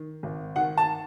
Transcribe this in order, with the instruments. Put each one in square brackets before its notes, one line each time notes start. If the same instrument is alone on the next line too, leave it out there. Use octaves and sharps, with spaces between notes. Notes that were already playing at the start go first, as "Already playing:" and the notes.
Already playing: [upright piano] D#3
G#1
D#3 F#5
A5